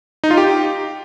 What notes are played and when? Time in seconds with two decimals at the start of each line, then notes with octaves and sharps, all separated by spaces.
0.24 D#4
0.30 F4
0.37 G4